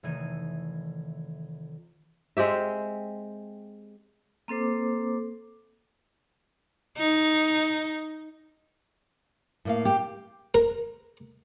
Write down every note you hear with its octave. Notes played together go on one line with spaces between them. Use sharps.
F1 D#3 E3 A3 G#6 D#7
G#3 C4 G4 E5
A#3 C4 A4 C5 D6
D#4
A2 A#3 F5
G4
A#4